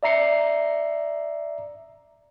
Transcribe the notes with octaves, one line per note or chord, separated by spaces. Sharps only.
D5 E5 A#5 C7 C#7